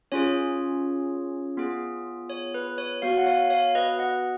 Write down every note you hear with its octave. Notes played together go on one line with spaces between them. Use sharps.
C#4 F4 G#4 C#5
B3 F4 G#4
C#5
B4
C#5
B3 F#4 C#5 F5
F#5
C#5 F5
C#5 F5
B4 D#5
D#5 F#5